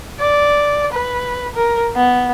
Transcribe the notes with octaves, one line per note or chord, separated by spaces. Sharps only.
D5
B4
A#4
B3